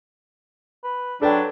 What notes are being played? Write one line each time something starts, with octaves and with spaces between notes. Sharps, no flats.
B4
F#3 D4 A4 B4 G5